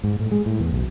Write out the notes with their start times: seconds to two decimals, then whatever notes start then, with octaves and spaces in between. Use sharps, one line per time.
0.04 G#2
0.20 A2
0.32 G#3
0.46 A2
0.60 E2
0.73 B1